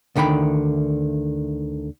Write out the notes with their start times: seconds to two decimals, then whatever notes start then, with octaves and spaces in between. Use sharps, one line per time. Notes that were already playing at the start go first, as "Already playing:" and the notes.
0.16 D2 D3 D#3 G5 B5